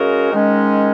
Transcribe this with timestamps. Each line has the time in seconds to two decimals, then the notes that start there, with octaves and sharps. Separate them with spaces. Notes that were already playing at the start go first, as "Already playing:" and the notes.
Already playing: C#3 G#3 C#4 F#4 A#4
0.31 G#2 D#3 G#3 C#4